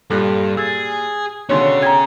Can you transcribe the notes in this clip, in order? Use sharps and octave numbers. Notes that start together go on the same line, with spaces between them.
G2 A#2 G3 A4 F#6
G#4 E6 G#6 A6
B2 D3 D#3 C#4 G#4 C#5 C6
G5 A#5 G#6